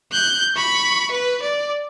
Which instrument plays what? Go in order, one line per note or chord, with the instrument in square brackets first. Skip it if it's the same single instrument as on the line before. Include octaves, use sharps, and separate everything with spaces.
[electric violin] F#6 G6
B5 C#6
B4
D5